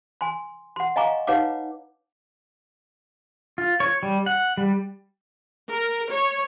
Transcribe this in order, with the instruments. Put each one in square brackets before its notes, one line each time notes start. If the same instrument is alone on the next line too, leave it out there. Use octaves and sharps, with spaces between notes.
[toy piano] G#5 C6
F#5 C6
D#5 F5 G#5 A#5 C#6 D6
D#4 B4 C#5 F5 F#5 D6
[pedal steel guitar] F4
C#5
G3
F#5
G3
[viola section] A#4
C#5